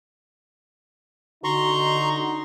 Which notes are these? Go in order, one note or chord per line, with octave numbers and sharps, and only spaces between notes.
D3 D#4 F#4 A#5 C6 C#6